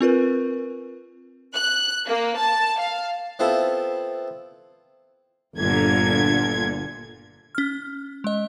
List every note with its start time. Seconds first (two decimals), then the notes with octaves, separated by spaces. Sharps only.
0.01 C4 F4 A#4 B4
1.54 F#6
2.07 A#3
2.37 A5
2.80 F5
3.39 B3 C4 E4 F4 A4
5.56 G1 A#2 D3 G#6
7.55 C#4 F6
8.24 G#3 D#5